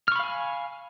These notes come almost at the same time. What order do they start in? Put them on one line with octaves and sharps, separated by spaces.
F6 C#6 B5 F5 G#5